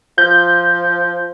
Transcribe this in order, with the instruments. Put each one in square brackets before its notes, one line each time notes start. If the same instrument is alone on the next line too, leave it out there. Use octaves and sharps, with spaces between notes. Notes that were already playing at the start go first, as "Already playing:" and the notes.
[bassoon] F3 [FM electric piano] G6